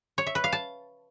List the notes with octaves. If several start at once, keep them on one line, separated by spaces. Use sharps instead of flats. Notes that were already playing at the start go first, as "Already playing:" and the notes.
C#5
E5
B4
F5
A5